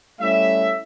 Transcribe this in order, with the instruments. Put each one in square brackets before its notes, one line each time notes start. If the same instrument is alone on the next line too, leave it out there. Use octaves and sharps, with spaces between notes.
[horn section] G3 A3 C#4 E4 E5